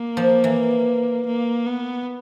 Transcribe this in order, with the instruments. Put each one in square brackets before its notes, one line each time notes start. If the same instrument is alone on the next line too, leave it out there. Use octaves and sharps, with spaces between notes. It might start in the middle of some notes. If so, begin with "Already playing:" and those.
Already playing: [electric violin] A#3
[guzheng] F3
E3
[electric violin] A#3
B3